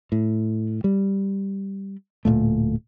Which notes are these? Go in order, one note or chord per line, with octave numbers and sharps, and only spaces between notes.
A2
G3
D1 C#2 A#2 A3